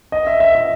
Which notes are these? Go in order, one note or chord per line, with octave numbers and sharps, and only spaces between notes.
D#5
E5
E5
E5